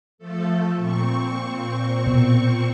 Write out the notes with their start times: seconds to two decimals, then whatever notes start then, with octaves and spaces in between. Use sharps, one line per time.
0.18 F3 A3 A4
0.77 A#2 C4 C#6
2.07 B2